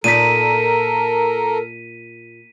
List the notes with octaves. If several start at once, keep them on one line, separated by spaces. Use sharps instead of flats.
A#2 D#4 A4 A#4 D5 B6 D#7